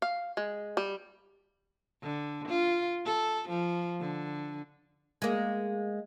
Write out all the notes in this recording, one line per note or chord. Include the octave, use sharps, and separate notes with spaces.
F5
G#3
G3
D3
F4
A4
F3
D3
G#3 A#3